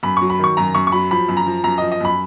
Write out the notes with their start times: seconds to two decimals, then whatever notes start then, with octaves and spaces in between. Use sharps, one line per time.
0.03 F#2 B5
0.17 F#3 C#6
0.30 B5
0.39 D#3 C#6
0.57 F#2 A#5
0.75 F#2 C#6
0.87 C#6
0.92 F#3 B5
1.11 F3 B5
1.29 F#2
1.37 A#5
1.46 F3
1.64 F#2 A#5
1.78 F3 D#5
1.92 D#5
2.00 F#2 B5